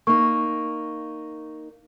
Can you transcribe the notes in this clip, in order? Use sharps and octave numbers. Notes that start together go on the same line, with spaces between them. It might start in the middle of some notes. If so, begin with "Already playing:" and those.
A#3 D#4 C#6